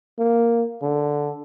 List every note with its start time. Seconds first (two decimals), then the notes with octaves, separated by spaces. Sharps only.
0.19 A#3
0.82 D3